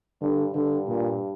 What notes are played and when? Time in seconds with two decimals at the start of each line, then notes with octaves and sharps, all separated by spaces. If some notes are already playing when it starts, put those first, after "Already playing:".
0.22 G2 D3
0.55 G2 D3
0.87 A#2